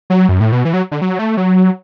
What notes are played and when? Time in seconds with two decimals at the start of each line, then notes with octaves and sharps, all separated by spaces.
0.10 F#3
0.29 F#2
0.40 A2
0.52 B2
0.65 E3
0.73 F#3
0.91 D3
1.02 F#3
1.19 A3
1.37 F#3